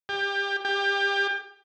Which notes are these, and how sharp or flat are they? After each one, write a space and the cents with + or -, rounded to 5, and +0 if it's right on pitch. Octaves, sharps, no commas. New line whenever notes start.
G4 +25
G4 +25